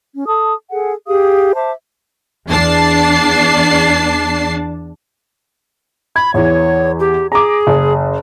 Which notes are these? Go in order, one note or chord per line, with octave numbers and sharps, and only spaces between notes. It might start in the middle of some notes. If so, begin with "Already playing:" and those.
C#4
A4 A5 D#6
G#4 A4 F#5
G4 G#4 F5 D#6
C5 E5 A5 D6
E2 D4 A5 C7
B5 G#6
E2 E3 C#5
G4
G#4 A#5 D6
F#1